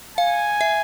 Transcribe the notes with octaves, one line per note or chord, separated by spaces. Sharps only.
F5 G#5
E5